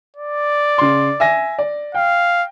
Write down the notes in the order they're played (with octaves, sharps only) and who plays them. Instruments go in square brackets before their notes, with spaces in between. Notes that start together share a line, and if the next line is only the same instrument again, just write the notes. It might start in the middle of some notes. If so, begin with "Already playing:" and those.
[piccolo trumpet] D5
[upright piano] C#3 C6
E5 G#5 A#6
D5
[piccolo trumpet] F5 [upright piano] G5